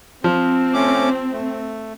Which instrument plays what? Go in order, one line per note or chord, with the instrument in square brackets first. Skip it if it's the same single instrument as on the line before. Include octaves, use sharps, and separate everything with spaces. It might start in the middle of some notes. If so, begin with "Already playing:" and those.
[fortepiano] F3 [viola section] C4
[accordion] A3 C#4 D6
A3